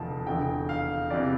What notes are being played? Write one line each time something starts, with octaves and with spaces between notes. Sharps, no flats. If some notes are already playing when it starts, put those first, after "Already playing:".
Already playing: F1 E2 D3 F3 A5
F1 E2 D3 G5
F5
E2 C3 E3 D5